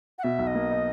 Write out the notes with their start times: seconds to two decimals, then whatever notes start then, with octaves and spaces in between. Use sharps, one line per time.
0.19 F#5
0.23 B2 E5
0.39 B1
0.47 D#5
0.55 A#3
0.71 D#4